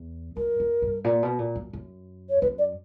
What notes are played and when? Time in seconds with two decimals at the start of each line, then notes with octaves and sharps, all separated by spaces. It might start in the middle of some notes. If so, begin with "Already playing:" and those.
Already playing: E2
0.37 F#2 A#4
0.60 F#2
0.82 G2
1.04 A#2
1.23 B2
1.39 A#2
1.56 F#2
1.73 F#2
2.30 C#5
2.42 F#2 B4
2.58 D5